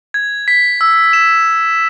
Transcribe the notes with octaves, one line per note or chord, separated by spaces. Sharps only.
G#6
B6
E6
E7